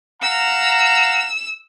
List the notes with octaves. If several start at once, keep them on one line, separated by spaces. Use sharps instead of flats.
F5 F#5 A#5 E6